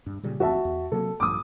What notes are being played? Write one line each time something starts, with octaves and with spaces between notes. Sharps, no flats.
G2
A#2 C#3 G3
D1 F2 F#4 E5 A5
E2
C3 F#3 A#3 A4
A#1 G2 F3 D6 D#6